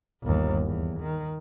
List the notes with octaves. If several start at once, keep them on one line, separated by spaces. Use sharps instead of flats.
G1 D#2
E2
D#3